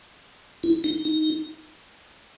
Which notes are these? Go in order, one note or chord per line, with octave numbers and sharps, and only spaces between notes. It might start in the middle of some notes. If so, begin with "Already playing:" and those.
E4
D#4
D#4